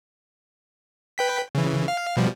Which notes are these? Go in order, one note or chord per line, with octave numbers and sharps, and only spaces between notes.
B4 G5 B6
C#3 E3
F5
B2 F3 G3